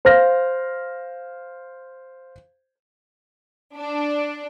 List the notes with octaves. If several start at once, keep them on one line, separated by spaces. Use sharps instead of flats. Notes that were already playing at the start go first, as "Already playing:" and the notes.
C5 F5 F6 A#6
D4